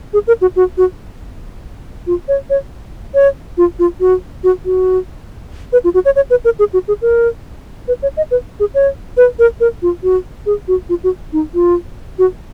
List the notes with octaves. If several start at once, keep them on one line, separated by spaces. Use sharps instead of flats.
G#4
A#4
F#4
F#4
F#4
F4
C#5
C#5
C#5
F4
F4
F#4
F#4
F#4
B4
F4
F#4
C#5
C#5
B4
A#4
G#4
F#4
G#4
A#4
B4
C#5
D#5
B4
G#4
C#5
B4
A#4
A#4
F4
F#4
G#4
F#4
F4
F#4
D#4
F4
F#4